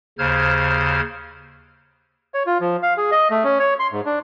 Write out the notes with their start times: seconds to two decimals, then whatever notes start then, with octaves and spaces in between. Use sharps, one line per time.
0.18 D#2 C#3 C5 F6 G#6
2.34 C#5
2.47 F4
2.61 F3
2.83 F5
2.97 G#4
3.12 D#5
3.31 A3
3.44 C#4
3.59 C#5
3.79 C6
3.92 G#2
4.06 D4